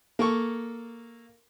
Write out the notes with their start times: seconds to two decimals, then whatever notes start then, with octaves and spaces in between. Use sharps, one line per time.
0.19 A#3 A4 C#6